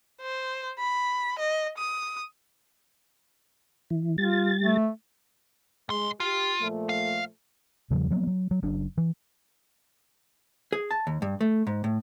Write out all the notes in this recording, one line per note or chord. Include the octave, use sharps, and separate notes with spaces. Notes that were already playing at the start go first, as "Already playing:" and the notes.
C5
B5
D#5
D#6
E3
G3 F4 A6
A3
B1 G#3 C6
F4 G4
A#2 F3 A3
F5
E2 C#3 F3 G3
F3 F#3 A#3 B3
F#3
F#3
F#1 F#2 D4
E3
G#4
A5
D#2
G2
A3
G#2
A2